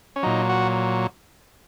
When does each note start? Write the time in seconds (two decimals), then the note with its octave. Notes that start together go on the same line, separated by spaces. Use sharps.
0.16 C#4
0.23 A#2 F#3 D#4
0.49 F#4